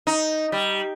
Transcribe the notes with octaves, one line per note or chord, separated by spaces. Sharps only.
D#4
G3